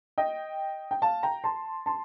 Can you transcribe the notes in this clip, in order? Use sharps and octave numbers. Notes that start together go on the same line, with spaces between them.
D#5 G5
G5
F5 A5
G5 A#5
A5 C6
A5 C6